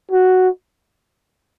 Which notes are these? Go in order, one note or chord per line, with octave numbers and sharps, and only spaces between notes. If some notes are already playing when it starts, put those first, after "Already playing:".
F#4